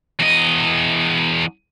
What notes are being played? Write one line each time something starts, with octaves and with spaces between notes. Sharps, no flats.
E2 D#5